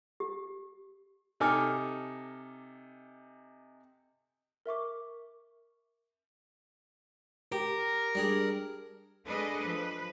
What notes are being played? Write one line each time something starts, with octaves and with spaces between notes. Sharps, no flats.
G4
C3 D#4 A4 G#5 D6 F6
A#4 E5 C#6 D6
G4 A#4
G3 D4 G#4
G#3 D4 G#4 A4 B4 D#5
F3 B4